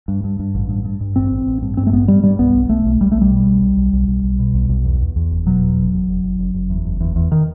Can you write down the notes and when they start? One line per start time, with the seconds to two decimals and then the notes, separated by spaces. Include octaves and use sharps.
0.08 G2
0.24 G2
0.40 G2
0.55 A1
0.69 G2
0.85 G2
1.01 G2
1.16 A1 C4
1.32 A1
1.47 A1
1.62 G2
1.77 G2 C4
1.87 A3
1.93 A1 B3
2.08 G2 G3
2.23 G2 G3
2.39 B1 B3
2.54 B1
2.69 B1 A3
2.85 B1
3.00 B1 G3
3.12 B1 A3
3.22 G3
3.31 B2
3.47 B1
3.61 B1
3.77 B1
3.93 B1
4.08 B1
4.24 B1
4.39 B2
4.54 B1
4.69 B1
4.85 E2
5.01 E2
5.16 E2
5.31 F#1
5.47 B2 F#3
5.63 E2
5.77 F#1
5.93 F#1
6.08 F#1
6.24 F#1
6.39 F#1
6.55 F#1
6.70 E2
6.85 F#1
7.01 E2
7.16 E2
7.32 D#3